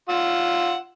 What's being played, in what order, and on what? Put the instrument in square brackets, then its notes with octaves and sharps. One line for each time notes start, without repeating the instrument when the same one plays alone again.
[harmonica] F4 F#5 E6